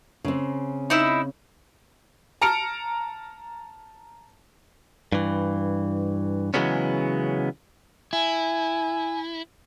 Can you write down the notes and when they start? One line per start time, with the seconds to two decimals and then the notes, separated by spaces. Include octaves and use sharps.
0.24 C#3 C4
0.90 D#4 E4 E6
2.41 A5 A#5 F6 C#7 D7
5.12 G2 E3
6.54 C#3 E3 F#3 G#3 B3 C#4
8.13 E4 G#5